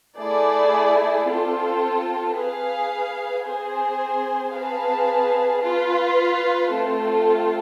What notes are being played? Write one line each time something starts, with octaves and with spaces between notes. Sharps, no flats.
A3 E4 G#4 D5
C4 F4 A4
G#4 B4 F5
C4 G#4 C5 G#5
C4 G#4 B4 F5 A5
F4 B4 F5
A3 C4 F4 A4